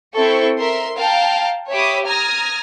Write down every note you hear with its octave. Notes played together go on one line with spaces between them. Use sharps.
C4 E4 A4 C#6
A#4 E5 C6
F5 G5 A5 A#5
G4 C#5 E5 B5 D6 D#6
A#5 D#6 F6 G#6 A#6